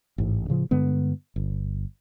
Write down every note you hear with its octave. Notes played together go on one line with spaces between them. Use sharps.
A1 G#2
A2 C#3 F3
G2 D3 G#3 B3
G1